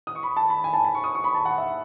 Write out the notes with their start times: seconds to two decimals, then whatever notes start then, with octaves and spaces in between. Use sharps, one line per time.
0.07 D#6
0.15 C#6
0.23 B5
0.37 A5
0.50 B5
0.64 G#5
0.73 A5
0.85 B5
0.95 C#6
1.04 D#6
1.15 C#6
1.24 B5
1.35 A5
1.45 F#5
1.58 E5